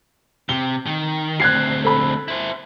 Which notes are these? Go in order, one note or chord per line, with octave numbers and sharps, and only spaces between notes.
C3 G7
D#3
D2 C4 F#6 G#6 C7
A4 B5
E4 C5